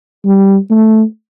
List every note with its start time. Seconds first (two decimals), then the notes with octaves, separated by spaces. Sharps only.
0.25 G3
0.71 A3